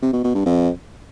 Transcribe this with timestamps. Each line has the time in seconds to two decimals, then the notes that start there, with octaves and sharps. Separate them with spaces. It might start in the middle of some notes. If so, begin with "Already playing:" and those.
0.02 C3
0.13 B2
0.24 B2
0.35 G2
0.46 F2